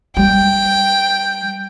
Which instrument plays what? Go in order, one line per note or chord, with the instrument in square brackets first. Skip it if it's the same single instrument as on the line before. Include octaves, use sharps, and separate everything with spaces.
[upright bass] G3 [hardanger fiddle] G5